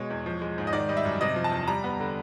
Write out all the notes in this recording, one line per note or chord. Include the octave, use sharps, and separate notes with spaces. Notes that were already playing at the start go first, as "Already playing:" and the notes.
Already playing: B2 G#3 C#5
E2
F3
G#3
G#2
D#5
D#3 D5
G3 D#5
E5
F#2
C3 D#5
F3
A5
E2
G3 A#5
B3
D3